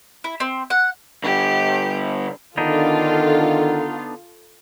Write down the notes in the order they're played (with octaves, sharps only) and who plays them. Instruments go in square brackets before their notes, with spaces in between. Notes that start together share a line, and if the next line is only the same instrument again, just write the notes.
[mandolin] E4
C4
F#5
[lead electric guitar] D3 G3 [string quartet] G4
[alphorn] D3 [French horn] D#3 [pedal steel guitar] B3 D4 D#4 [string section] F4 A4